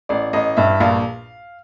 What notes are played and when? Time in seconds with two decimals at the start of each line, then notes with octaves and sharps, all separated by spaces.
0.09 A1 D5
0.33 A1 D#5
0.57 G2 E5
0.80 A#1 F5